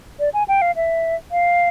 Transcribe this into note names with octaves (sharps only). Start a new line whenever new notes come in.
D5
G#5
G5
F5
E5
F5